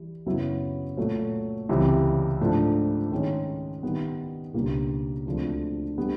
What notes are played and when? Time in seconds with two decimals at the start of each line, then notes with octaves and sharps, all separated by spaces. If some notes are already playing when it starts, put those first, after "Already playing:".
Already playing: E3 G3
0.26 F#2 C#3 F#3 B3 E4
0.97 A#2 F#3 A3
1.69 C#2 C3 E3 G3
2.40 G#2 F3 A3 D4
3.12 D#3 G#3 C#4
3.83 D#3 G3 B3
4.54 C#2 B2 G3 A#3 D4
5.26 D2 D3 F3 G#3 C4
5.98 D3 G3 B3